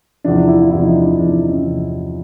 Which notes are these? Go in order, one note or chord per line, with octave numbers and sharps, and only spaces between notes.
E2 C3 F3 D4
D4
E4
F4
E2 C3 F3 E4
D#4
D4
D4
E2 C3 F3 D4
D#4
D#4
C#4
D4
E2 C3 F3